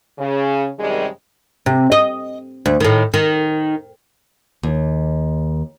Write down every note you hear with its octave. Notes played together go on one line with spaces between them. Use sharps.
C#3
F#2 C3 D#3 G3 G#3
C3
D#5
D2
A2 D#3
D#3
D#2